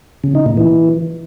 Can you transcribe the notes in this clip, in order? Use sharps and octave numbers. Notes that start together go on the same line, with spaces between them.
C#3
D#4
A#2
E3